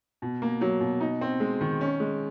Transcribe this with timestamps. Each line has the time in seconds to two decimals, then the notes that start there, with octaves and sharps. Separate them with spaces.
0.22 B2
0.42 A#3
0.61 F#3
0.81 B2
1.01 D#4
1.21 C4
1.40 G#3
1.61 D#3
1.81 C#4
2.00 G#3